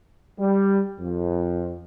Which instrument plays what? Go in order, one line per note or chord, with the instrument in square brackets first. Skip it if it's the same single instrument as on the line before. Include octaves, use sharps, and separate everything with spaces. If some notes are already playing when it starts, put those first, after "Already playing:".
[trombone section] G3
F2